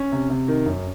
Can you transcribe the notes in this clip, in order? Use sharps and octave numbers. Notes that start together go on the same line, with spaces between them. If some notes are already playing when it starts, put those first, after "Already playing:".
Already playing: C#4
C3
C3
D#3
F#2